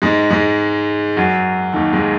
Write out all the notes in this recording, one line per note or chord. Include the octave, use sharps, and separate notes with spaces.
G#2 G#3
G#2 G#3
F#2 F#3
D#2 D#3
G#2 G#3